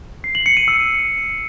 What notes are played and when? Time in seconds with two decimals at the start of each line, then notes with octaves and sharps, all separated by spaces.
0.24 C7
0.35 F#7
0.46 C#7
0.57 D#7
0.68 E6